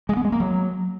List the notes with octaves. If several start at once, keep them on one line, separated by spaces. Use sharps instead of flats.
G#3
B3
G#3
A#3
F#3